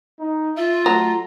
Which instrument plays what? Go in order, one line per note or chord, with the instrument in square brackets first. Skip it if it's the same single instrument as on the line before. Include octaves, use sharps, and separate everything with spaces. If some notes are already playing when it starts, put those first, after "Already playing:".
[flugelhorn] D#4
[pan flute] F4 [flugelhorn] E5
[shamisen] F#3 [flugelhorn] A3 [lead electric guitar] A#5